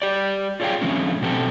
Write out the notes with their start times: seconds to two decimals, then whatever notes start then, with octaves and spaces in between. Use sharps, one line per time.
0.02 G4 D5
0.60 F4 G#4 C#5 E5 F5 G5
0.81 D3 F3 G#3 A3 C4 C#4
1.22 B2 C4 G4 A4